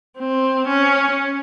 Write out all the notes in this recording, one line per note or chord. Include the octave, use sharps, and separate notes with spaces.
C4
C#4